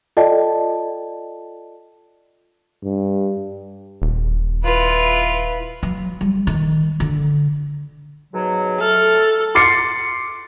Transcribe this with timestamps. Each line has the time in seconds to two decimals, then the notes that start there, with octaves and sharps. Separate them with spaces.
0.17 F4 A4 D5 D#5 G5 A5
2.84 G2
4.02 D#1
4.64 E4 F4 B4
5.83 F#3
6.21 G3
6.47 D#3
7.00 D3
8.33 G#2 B2 F#3
8.81 A3 A4 F6
9.55 C6 D6 A6 C7 C#7